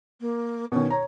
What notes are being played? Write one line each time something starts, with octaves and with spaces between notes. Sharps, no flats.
A#3
B2 D#3 C#4
C#5 A#5